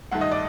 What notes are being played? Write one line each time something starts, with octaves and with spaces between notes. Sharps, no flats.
G2 D#3 A3 F#5
D#5
D5